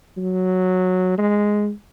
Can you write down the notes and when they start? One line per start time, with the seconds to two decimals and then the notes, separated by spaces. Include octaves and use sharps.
0.17 F#3
1.18 G#3